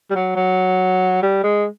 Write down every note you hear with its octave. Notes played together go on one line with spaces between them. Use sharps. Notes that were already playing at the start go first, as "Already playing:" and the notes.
G3
F#3
F#3
G3
G#3